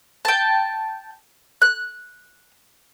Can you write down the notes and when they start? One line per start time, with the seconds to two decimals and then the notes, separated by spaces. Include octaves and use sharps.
0.25 G5 A5
1.62 F#6